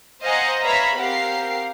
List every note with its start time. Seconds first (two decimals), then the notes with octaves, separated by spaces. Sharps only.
0.23 C5 D#5 F5 F#5 G#5 A#5
0.62 B4 C#5 E5 F5 A#5 B5
0.96 C4 G4 A#4 F5 F#5 C7